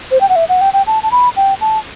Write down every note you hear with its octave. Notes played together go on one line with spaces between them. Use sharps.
C5
G5
F#5
E5
F#5
G5
G5
A5
A5
B5
G5
A5